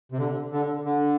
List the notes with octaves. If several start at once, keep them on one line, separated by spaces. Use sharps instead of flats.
C3
D3
D3
D3